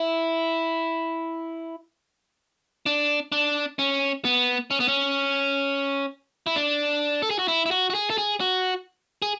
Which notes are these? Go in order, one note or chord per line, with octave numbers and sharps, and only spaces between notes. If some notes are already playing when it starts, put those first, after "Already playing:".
Already playing: E4
D4
D4
C#4
B3
C#4
B3
C#4
E4
D4
A4
G#4
F#4
E4
E4
F#4
F#4
G#4
A4
G#4
F#4
G#4